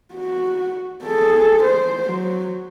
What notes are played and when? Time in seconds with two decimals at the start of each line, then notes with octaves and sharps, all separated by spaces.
0.13 F#4
1.05 G#4 A4
1.64 C5
2.06 F#3